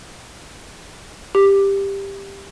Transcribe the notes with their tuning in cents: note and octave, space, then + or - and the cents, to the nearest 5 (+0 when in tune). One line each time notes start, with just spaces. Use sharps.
G4 +10